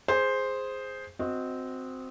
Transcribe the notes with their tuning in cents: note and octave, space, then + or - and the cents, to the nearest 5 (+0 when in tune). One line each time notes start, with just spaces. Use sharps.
G#4 +0 C5 +0
C4 -10 F#4 -20 D#5 +0